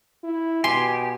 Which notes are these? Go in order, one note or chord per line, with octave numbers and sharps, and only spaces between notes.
E4
B2 G4 G#5 C6